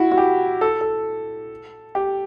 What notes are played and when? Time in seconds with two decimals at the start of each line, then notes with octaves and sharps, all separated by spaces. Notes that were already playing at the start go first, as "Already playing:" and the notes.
Already playing: E4 F#4
0.12 F#4
0.18 G4
0.61 A4
0.81 A4
1.95 G4